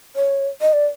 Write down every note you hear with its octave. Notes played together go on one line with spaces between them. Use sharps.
C#5
D#5
D5